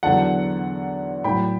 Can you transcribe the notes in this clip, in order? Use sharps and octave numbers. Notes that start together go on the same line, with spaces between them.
E2 D3 F#3 F#5 A5
A2 F#3 G5 B5